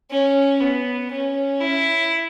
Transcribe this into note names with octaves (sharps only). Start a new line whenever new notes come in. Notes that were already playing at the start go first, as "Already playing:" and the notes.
C#4
B3
C#4
E4